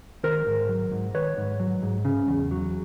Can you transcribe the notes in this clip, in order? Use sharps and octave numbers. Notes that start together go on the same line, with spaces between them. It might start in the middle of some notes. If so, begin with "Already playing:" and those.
D#3 A#4 C5
G#2
F#3
G#2
D#3 B4 C#5
G#2
F#3
G#2
C#3
E2
F#3